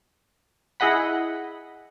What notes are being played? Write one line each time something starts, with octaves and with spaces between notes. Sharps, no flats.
E4 G#4 D#5 F#5 B5